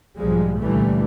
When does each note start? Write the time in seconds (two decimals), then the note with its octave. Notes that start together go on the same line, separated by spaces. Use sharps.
0.16 B1 G#2 F3 G3 G#3
0.58 C#2 A#2 D3 E3 G3 A3